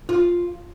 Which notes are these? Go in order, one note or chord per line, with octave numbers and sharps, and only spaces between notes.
F4